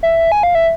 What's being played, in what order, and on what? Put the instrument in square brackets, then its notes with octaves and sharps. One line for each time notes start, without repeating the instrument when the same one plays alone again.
[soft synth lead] E5
G#5
F5
E5